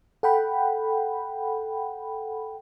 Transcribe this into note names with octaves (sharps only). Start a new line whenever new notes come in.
A4 F#5 G5 B5